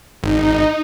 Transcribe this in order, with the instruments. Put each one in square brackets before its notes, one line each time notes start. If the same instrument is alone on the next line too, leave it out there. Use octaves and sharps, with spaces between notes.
[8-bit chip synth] G#1 [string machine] D#4